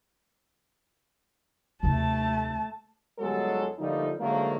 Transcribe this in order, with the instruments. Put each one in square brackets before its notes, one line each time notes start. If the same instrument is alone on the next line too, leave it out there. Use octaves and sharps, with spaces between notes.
[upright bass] D#2 C3 [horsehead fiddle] A3 A5
[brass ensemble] G1 F#3 G#3 A4
D3 F3 G3 A3 A#3 D#4
G#2 D3 F3 F#3 A3 A#3